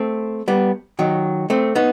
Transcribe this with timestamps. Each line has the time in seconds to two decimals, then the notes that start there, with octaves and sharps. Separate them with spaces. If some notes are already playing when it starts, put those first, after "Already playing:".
Already playing: A3 C4
0.48 G3 B3
0.99 D#3 F#3
1.50 A3 C4
1.75 B3 D#4